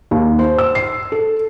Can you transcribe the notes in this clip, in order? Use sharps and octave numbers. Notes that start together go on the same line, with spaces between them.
D#2
C5
E6
C7
A4